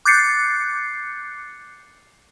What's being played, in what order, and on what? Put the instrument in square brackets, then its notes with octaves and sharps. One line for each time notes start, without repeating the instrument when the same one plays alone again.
[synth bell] D6 F#6 G6 A6 C7 C#7